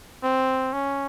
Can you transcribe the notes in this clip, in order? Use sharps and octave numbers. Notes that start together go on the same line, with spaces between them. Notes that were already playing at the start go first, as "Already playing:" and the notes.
C4
C#4